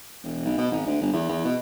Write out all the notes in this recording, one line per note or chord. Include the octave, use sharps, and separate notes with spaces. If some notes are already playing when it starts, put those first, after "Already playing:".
E1
B1
B2
G#1
D2
G1
E2
E2
B2